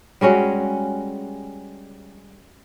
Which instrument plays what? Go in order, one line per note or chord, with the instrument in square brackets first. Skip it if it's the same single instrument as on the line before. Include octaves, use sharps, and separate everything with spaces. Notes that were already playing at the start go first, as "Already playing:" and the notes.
[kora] G3 G#3 C#4 F#4